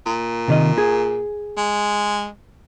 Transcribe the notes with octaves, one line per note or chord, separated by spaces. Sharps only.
A#2
C3 D#3 D#5
G#4
G#3